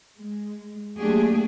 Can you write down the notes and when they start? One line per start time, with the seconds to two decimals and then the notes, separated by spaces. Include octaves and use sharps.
0.18 G#3
0.98 F#3 A3 A#3 D4 G4 G#4